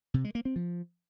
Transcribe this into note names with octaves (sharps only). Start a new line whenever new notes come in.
C3
G#3
A#3
C4
F3